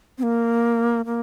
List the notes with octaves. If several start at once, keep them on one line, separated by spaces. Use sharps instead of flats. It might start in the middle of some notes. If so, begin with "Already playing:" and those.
C4
A#3
A#3